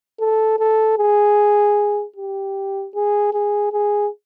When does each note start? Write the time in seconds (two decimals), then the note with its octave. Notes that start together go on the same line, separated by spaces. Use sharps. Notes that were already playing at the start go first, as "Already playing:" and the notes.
0.20 A4
0.59 A4
0.98 G#4
2.17 G4
2.95 G#4
3.33 G#4
3.73 G#4